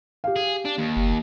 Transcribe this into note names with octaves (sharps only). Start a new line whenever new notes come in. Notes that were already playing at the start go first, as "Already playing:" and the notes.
G4 F5
G#4
D4
D#2
F#1